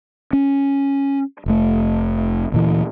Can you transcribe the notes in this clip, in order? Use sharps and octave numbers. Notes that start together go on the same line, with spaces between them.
C#4
F1 A3
D2 A#2 E3